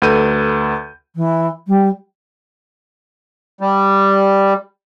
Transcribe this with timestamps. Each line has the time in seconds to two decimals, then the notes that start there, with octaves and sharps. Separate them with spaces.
0.02 D2 A4 B4 G6 D#7
1.16 E3
1.67 G3
3.61 G3